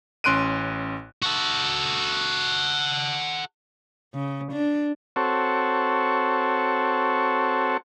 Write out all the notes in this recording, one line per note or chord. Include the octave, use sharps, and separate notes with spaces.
A1 C#4 C6 F#6 D7 D#7
F#4 A4
C#3
D4
C4 F#4 A4 C#5